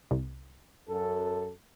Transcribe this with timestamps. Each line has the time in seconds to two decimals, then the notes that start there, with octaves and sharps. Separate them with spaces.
0.11 C2
0.88 F#2 A4